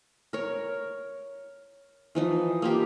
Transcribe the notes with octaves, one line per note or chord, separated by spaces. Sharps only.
A#4 C#5
E3 F3 D#4
A#3 F4 G4